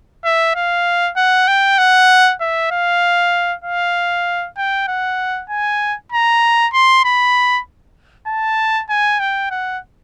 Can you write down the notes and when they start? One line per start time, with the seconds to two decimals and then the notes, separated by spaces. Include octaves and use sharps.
0.25 E5
0.56 F5
1.17 F#5
1.48 G5
1.78 F#5
2.41 E5
2.71 F5
3.64 F5
4.57 G5
4.88 F#5
5.50 G#5
6.12 A#5
6.73 C6
7.05 B5
8.27 A5
8.90 G#5
9.20 G5
9.51 F#5